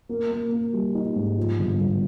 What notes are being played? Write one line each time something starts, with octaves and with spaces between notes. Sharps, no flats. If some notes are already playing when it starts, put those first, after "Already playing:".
A#3
A#3
A#3
G3
D#4
G#2
F3
G1
G1